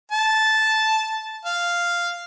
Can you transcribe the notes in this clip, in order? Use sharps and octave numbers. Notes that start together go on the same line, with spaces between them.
A5
F5